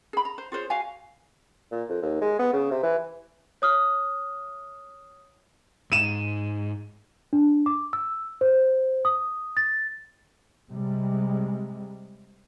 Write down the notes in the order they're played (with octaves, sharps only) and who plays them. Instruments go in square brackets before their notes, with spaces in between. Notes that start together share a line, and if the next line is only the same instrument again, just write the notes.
[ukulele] G#4 B5
A#5
C5
F4 G#4 C5 C#5
F#4 F5 G#5
[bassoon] A#2
F2
D#2
G#3
B3
C#3
C3
E3
[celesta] C#5 D#6 F6
[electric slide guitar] G#2 [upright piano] D#7 E7
[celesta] D4
D6
E6
C5
D#6
A6
[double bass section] C3 G3 G#3